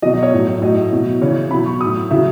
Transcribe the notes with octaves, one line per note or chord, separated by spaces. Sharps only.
B2 F#3 D#5
D#5
C#5
A2 F#3
A2 F#3 D#5
B2 F#3
C#3 E3 C#5
B2 F#3 B5
C#6
A2 F#3 D#6
C#3 F#3 E5